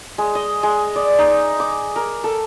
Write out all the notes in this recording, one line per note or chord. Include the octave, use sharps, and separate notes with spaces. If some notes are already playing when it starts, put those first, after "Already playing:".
G#3
D#5
G#3
D5
D#4
D6
A#4
A4